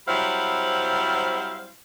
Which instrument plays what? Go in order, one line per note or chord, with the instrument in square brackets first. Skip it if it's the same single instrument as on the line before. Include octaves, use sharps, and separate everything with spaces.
[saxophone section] F#3 G3 C4 E4 C5 F5